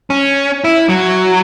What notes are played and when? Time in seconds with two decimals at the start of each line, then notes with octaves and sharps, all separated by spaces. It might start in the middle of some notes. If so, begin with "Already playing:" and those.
0.10 C#4
0.64 E4
0.89 F#3